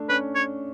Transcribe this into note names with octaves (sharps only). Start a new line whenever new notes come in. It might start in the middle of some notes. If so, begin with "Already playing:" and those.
Already playing: A3 D4
C#4 B4
C#5